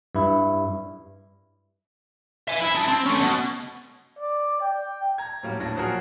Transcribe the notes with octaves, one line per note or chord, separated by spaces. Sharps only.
G2 E4
E5 G#5
E4
D#4 A5
C4
A3 C#4
B2
D5
G5
A#5 G#6
A2 F#3 G3 A#3 C#4
A2 D4 A#6
A#2 F3 F#3 F#4 G#4 A#4